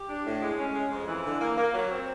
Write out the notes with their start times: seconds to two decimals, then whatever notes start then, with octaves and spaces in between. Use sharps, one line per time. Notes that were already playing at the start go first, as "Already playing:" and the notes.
Already playing: G4
0.09 D4
0.26 A2
0.43 G#3
0.59 C#4
0.75 G#3
0.92 F2
1.08 E3
1.25 D3
1.41 A#3
1.57 A#3
1.74 F#3
1.91 C4